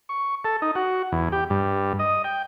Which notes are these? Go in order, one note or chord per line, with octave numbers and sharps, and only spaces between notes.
C#6
A4
D#4
F#4
E2
G4
G2
D#5
G5